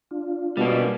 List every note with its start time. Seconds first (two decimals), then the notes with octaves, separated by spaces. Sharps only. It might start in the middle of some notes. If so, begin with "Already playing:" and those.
0.11 D4 F4
0.57 B2 G3 A#3